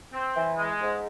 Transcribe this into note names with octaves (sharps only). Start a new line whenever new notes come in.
C4
E3
G#3
G#2